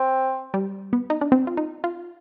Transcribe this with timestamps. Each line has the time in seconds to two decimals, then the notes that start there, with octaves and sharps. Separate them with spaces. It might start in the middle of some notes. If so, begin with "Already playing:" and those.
Already playing: C4
0.54 G3
0.93 B3
1.10 D#4
1.21 D4
1.32 C4
1.47 F4
1.57 D#4
1.84 F4